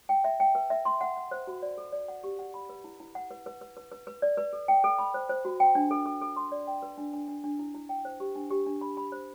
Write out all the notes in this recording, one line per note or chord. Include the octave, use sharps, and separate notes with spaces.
G5
E5
G5
B4
E5
C6
F#5
F#5
C5
F#4
D5
A4
D5
F#5
G4
F#5
B5
B4
E4
E4
F#5
B4
B4
B4
B4
B4
B4
D5
B4
A4
G5
A4
B5
C5
C5
F#4
G5
D4
A4
A4
A4
C6
D5
G5
B4
D4
D4
D4
D4
E4
E4
G5
C5
G4
D4
G4
D4
B5
B5
C5